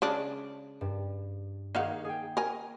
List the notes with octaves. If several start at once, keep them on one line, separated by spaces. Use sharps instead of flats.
C#3 G#3 D4
G2
D#3 A#3 D#4 G#4 F5 F#5
G#4 G5
A#4 G#5